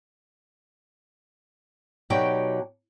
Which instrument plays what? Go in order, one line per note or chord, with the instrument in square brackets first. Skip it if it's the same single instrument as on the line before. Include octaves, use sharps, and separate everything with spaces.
[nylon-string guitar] B2 F#3 D#4 G4 D5 G5